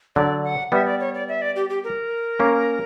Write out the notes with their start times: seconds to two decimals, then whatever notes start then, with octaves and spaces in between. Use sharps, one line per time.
0.16 D3 F#3 D5
0.44 F#5
0.72 G3 B3 E5
0.86 D5
1.00 C#5
1.15 D5
1.29 E5
1.42 D5
1.56 G4
1.70 G4
1.84 A#4
2.40 A#3 C#4